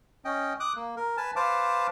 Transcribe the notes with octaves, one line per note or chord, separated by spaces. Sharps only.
C#4 D#5 G5
D6 D#6 F#6
A#3
A#4
B4 G#5 A5
B4 C5 F5 A5 D6